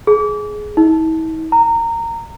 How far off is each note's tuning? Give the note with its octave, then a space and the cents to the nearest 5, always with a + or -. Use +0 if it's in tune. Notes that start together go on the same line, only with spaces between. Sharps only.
G#4 +15
E4 -45
A#5 -20